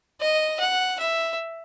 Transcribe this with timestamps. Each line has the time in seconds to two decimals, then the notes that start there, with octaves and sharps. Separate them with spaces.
0.21 D#5
0.60 F#5
0.99 E5